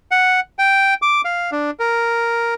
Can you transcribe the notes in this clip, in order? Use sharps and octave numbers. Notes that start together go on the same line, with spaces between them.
F#5
G5
D6
F5
D4
A#4